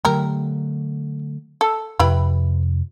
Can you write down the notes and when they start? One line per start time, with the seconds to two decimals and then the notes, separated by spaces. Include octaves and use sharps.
0.05 D3 F#3 A3 G4 A#4
1.61 A4
1.99 F2 C3 E4 G4 B4